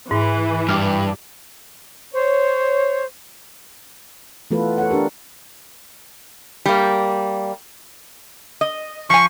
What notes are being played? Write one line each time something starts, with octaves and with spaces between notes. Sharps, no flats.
G#2 E3
G2 D6 F6
C5 C#5
E3 A3 B3 F4 A4 B4
A4 C#5 F#5
D4 G4 A#4
G3 A#3
D#5
F3 G#5 C#6